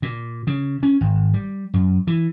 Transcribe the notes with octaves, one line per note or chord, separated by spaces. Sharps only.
A#2
C#3
C#4
G#1
G3
F#2
E3